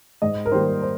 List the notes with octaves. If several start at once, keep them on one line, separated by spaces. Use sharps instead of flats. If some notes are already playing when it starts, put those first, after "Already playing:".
G#2 D#5
A#4
D#3 G3 A#3 C5
C5